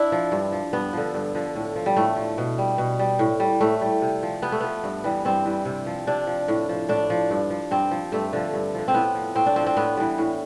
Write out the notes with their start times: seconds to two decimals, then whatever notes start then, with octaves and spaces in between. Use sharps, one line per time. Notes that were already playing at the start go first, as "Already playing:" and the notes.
Already playing: D4 E4
0.12 F3
0.32 G2
0.52 F3
0.73 G2 B3
0.93 D3 F3
1.14 G2
1.35 D3 F3
1.55 A2
1.76 F3
1.86 G3
1.96 A2 A3
2.16 F3
2.38 B2
2.58 G3
2.78 B2
2.99 G3
3.19 A2
3.40 G3
3.60 A2 A3
3.81 G3
4.02 C3
4.23 F3
4.42 C3 B3
4.52 A3
4.61 F3 B3
4.84 G2
5.04 E3 G3
5.25 G2 C4
5.45 E3 G3
5.65 C3
5.86 F3
6.07 C3 D4
6.27 F3
6.48 A2
6.69 F3
6.89 A2 D4
7.10 F3
7.31 G2
7.50 F3
7.71 G2 C4
7.91 F3
8.12 G2 A3
8.33 D3 F3
8.53 G2
8.75 D3 F3
8.88 C4
8.94 A2 B3
9.15 F3
9.35 A2 C4
9.46 D4
9.56 F3 C4
9.66 C4
9.76 A2 B3
9.97 E3 G3
10.18 A2